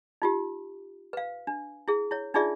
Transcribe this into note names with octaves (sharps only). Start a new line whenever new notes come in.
D#4 F4 G4
B4 F5
D4
E4 G#4
E4 C#5
D4 D#4 F4 G#4 D5 E5